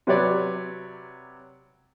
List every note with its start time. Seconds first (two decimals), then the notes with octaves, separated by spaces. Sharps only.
0.07 C3 F#3 B4 C#5 D5